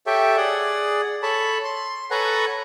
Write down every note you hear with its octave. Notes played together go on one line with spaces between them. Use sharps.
G4 A4 C#5 E5 G5
G#4 D5 F#5
A4 C#5 A5 B5
C6
A4 B4 C#5 F#5 G#5 A#5